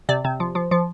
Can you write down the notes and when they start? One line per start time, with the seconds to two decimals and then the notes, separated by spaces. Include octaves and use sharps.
0.09 C3 D5
0.25 C3
0.40 F3
0.55 F3
0.71 F3